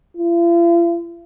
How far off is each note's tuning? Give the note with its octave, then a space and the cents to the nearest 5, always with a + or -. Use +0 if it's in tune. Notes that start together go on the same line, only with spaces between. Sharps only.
F4 -45